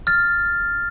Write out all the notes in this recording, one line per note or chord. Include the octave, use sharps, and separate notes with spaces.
F6 A6